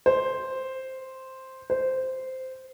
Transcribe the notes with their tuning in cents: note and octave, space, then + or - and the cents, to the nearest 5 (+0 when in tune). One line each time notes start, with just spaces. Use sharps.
C5 +0
C5 -10